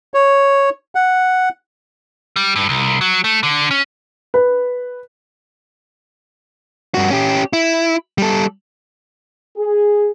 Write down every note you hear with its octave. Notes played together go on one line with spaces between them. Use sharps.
C#5
F#5
G3
G2
C2
F#3
A3
D3
C#4
B4
G2 F#4
C#4 G4
E4
G3 A4
G#4